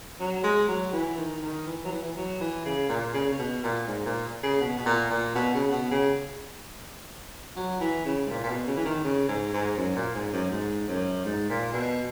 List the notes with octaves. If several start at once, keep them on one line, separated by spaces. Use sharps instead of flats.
F#3
G#3
F#3
E3
D#3
D#3
E3
F#3
E3
E3
F#3
E3
C#3
A#2
C#3
C#3
B2
A#2
G#2
A#2
C#3
B2
B2
A#2
A#2
B2
C#3
B2
C#3
F#3
E3
C#3
G#2
A#2
A#2
B2
C#3
E3
D#3
C#3
G#2
G#2
F#2
A#2
G#2
F#2
G#2
F#2
G#2
A#2
B2